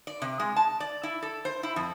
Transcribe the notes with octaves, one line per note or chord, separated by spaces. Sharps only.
D5
C3
G#3
A5
D5
E4
A4
C5
E4
F2